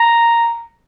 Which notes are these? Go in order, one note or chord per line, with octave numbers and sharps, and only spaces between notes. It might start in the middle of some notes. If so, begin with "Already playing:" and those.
Already playing: A#5